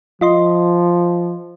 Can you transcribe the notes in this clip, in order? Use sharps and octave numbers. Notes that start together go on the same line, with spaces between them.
F3 F4 D#5 C6